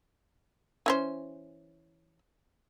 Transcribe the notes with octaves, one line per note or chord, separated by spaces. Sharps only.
E3 C#4 C5